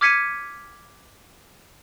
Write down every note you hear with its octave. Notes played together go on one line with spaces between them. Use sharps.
D6 F6 G#6 B6 C#7 D#7